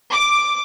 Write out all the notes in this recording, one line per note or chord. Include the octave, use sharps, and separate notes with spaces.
D6